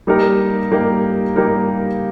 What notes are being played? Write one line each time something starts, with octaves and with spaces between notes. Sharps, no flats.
G3 A#3 D#4 G4 A#4
G3 A#3 D#4 G4 A#4
G3 A#3 D#4 G4 A#4